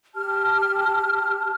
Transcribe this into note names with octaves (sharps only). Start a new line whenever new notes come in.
G4 A5 F6